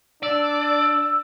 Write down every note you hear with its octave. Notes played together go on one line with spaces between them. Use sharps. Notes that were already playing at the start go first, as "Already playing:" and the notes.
D4 D5 E6